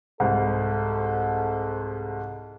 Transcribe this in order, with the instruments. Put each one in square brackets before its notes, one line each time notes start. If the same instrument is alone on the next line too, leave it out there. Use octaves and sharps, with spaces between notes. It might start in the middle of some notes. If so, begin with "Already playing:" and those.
[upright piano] C2 G#2 [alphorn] A4